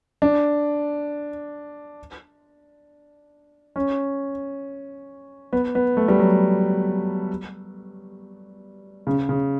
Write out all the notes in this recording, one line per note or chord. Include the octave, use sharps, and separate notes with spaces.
D4
C#4
B3
B3
A3
G3
F#3
C#3
C#3